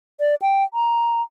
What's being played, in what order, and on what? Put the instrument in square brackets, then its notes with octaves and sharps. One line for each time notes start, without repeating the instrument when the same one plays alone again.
[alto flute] D5
G5
A#5